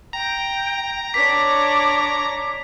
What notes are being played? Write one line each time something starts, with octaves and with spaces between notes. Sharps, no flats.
G5 A#5
D4 C#5 D6 B6